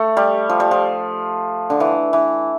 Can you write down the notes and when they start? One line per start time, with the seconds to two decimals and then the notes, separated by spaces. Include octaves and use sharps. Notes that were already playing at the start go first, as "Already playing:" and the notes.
Already playing: A3
0.17 G3
0.49 F3
0.60 G3
0.71 F3
1.70 D3
1.80 E3
2.13 E3